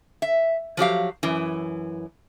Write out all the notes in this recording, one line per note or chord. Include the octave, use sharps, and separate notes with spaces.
E5
F3 F#3 G4 F5
F#2 E3